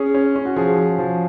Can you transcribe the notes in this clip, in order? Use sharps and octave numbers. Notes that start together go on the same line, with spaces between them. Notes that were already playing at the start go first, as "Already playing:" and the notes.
Already playing: C#4 G#4
C#4
C#4
F#4
F3 G#4
F3
F3